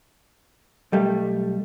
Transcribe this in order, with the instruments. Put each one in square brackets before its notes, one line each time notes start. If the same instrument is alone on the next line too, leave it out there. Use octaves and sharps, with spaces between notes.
[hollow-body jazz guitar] B1 G3 A3